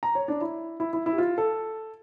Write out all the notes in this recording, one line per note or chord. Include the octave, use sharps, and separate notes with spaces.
A#5
C#5
D4
E4
E4
E4
E4
G4
F4
A4